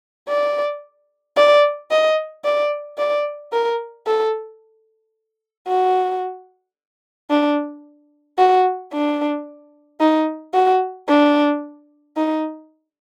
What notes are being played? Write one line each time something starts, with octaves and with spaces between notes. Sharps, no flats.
D5
D5
D#5
D5
D5
A#4
A4
F#4
D4
F#4
D4
D#4
F#4
D4
D#4